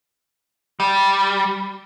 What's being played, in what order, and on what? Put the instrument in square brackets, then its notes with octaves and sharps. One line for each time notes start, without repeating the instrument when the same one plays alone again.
[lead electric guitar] G3